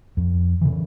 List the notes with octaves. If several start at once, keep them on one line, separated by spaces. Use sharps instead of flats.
F2
C#3 E3